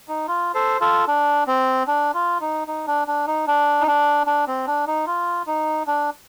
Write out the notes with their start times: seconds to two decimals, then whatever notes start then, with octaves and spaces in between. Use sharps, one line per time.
0.08 D#4
0.28 F4
0.54 A4 C5
0.81 F4 A4
1.08 D4
1.47 C4
1.87 D4
2.14 F4
2.41 D#4
2.68 D#4
2.87 D4
3.08 D4
3.27 D#4
3.47 D4
3.81 D#4
3.87 D4
4.27 D4
4.48 C4
4.67 D4
4.87 D#4
5.07 F4
5.47 D#4
5.87 D4